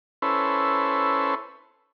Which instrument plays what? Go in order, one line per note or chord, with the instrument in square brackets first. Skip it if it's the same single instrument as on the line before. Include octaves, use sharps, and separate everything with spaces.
[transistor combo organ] C#4 E4 A4 B4 C5